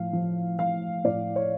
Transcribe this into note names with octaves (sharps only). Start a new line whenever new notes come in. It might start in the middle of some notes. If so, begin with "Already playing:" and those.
Already playing: A2 F3 F5
F3
F3 F5
A2 D5
C#5